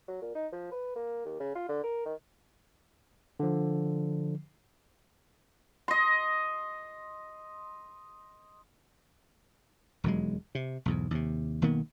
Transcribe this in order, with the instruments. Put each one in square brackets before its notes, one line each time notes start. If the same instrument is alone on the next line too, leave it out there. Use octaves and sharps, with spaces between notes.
[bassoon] F#3
A#2
D#4
F3
B4
A#3
D#2
C#3
F4
D3
A#4
D#3
[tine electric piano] D3 F3
[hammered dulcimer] D#5 C6
[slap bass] E1 D#2 F#3 G#3
C3
B1 E2 G#2
D#2 C3
B1 D#3 A#3 B3